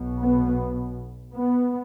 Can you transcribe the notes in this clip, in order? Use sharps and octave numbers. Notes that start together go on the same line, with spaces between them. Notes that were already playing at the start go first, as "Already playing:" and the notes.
Already playing: B1 B2
B3
B3